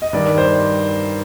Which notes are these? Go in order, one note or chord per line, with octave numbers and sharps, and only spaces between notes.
D#5
G2 D#3 D5
C5